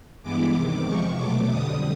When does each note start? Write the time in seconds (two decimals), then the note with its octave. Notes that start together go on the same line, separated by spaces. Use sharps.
0.22 G2 E3 G#3 B3 D6
0.54 E2 C3 D#3
0.86 E2 C3 F3 G#3 C#6
1.17 B2 F#3 A3 D6
1.49 F2 D3 G3 D#6